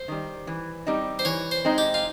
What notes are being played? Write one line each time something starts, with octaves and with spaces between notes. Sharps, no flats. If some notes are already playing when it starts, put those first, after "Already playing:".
Already playing: C5
D#3 G3
E3
G3 C4 D#4
C5
E3 C#5
C5
G#3 C4 D#4
G4
F4